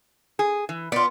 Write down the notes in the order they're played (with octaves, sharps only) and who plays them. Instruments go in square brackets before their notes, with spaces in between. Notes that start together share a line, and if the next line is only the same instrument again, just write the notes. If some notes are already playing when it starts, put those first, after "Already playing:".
[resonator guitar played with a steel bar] G#4
E3
[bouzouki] B3 F4 [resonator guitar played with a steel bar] D5